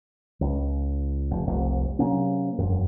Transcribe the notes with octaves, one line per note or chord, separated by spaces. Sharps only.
C#2
F1
F1 C2
C3 F#3 A#3 C#4
E1 F#2